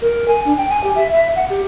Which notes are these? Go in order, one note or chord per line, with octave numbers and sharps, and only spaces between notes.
A#4
G#5
D4
G5
G#5
G4
E5
E5
F#5
G4